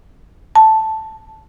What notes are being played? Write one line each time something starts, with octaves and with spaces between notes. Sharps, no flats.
A5